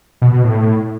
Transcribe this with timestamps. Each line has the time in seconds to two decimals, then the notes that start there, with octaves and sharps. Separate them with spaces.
0.22 B2
0.33 B2
0.44 A2